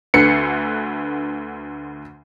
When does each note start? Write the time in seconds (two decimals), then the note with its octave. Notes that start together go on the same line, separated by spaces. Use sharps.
0.14 D2 D3 B4 C7 C#7